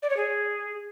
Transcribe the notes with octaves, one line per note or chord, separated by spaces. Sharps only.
D5
C#5
G#4